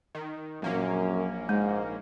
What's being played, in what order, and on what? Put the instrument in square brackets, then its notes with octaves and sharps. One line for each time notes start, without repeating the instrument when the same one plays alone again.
[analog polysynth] D#3
[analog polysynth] A#1 A#3 C#4 [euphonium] F#2
[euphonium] G#2 [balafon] G#3